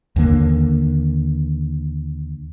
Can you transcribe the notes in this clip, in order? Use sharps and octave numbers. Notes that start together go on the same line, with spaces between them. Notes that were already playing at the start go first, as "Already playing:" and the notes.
D#2 D3 A#3